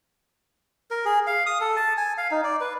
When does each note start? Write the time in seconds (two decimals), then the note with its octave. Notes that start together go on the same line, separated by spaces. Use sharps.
0.91 A#4
1.05 G#4
1.27 F5
1.46 D#6
1.61 A4
1.76 A5
1.97 G#5
2.18 F5
2.31 D#4
2.44 D5
2.61 B4